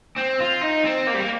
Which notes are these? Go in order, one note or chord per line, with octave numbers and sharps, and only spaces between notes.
C4
F4
D#4
C4
A#3
G3
A#3